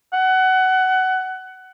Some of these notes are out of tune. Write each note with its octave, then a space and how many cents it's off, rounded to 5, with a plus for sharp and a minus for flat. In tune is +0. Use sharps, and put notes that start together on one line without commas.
F#5 +20